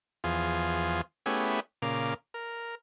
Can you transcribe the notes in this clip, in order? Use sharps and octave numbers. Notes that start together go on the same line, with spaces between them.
E2 F3 F4 G#4
A3 B3 C#4 E4 G4 G#4
A#2 C#3 A#4 F5 D6
A#4